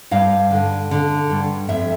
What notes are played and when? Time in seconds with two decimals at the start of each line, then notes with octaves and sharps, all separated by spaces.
0.11 G2 F5
0.51 D3
0.91 D3
1.30 G2
1.69 F2 E5